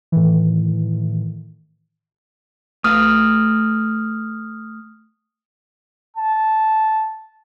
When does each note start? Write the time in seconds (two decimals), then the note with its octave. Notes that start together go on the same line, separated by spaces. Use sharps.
0.12 A2 D#3 E3
2.84 A3 B4 F5 D#6 F6
6.16 A5